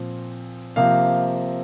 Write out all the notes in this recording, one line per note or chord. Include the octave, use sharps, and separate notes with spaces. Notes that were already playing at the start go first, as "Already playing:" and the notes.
Already playing: A#2 F3 C4
C3 F3 A#3 F5